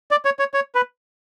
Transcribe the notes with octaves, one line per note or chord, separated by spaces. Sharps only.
D5
C#5
C#5
C#5
B4